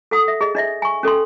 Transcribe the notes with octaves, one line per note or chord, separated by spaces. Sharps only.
A4 F#5 D#6
E5
G#4 D#5
D4 D#5 E5
G#5 C#6
C#4 A4 G5 C6